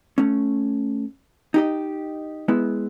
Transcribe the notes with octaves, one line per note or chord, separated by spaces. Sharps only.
A3 C#4
D#4 G4 D#5
G#3 B3 E4